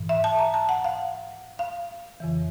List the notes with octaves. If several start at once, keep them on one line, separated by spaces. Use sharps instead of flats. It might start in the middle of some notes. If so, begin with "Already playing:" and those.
Already playing: G#2 E3
E5
A5
A#5
A5
F#5
F5
F5
F2 C#3 E3